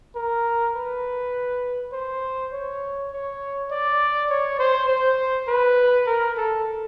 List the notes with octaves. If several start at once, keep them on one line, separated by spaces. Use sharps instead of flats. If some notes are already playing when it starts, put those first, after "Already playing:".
A#4
B4
C5
C#5
C#5
D5
C#5
C5
C5
B4
A#4
A4